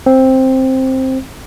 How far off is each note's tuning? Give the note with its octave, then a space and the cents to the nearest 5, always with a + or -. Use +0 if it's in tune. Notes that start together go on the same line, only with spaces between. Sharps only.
C4 +5